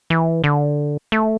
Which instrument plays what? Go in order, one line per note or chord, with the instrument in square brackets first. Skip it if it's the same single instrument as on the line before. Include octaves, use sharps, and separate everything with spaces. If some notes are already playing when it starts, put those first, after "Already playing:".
[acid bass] E3
D3
A3